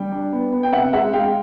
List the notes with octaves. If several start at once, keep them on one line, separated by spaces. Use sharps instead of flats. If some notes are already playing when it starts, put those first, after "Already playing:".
Already playing: G3 G5
D4
B3
B3
G5
C3 E5 F#5
G#3 E5 F#5
G#3 F5 G5